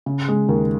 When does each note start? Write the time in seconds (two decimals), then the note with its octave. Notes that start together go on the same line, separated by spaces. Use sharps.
0.06 C#3
0.28 G#3
0.49 D#2